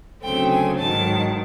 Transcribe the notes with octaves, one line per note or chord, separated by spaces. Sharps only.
D2 C#3 F#3 A3 C4 G5
G#5
G#2 D#3 F#3 A5